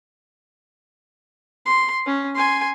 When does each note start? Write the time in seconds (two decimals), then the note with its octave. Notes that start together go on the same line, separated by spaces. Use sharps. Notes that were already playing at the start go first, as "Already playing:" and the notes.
1.66 C6
2.06 C#4
2.35 G#5 C6